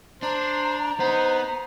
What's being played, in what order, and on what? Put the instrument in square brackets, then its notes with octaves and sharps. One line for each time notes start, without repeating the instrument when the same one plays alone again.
[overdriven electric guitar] D4 [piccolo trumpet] C5 [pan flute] A#5
[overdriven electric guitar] B3 [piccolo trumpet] D#4 [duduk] C5